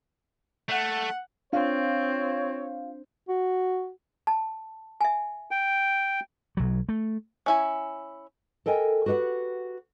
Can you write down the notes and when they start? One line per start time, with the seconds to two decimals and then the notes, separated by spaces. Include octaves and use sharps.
0.69 A3 F#5
1.53 C4 D4 F4 C#5 F5
3.29 F#4
4.27 A5
5.01 E5 G#5
5.51 G5
6.57 B1 F#3
6.89 A3
7.46 C#4 E4 G#5
8.66 A4 A#4 D#5 G5 G#5
9.06 F#4 G4 B4 D#5 F#5